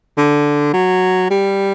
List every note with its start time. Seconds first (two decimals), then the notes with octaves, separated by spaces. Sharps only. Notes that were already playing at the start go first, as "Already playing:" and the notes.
0.17 D3
0.73 F#3
1.30 G3